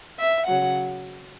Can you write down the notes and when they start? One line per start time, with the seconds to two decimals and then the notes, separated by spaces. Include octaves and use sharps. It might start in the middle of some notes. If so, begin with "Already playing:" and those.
0.19 E5
0.47 C#3 F#3 F#5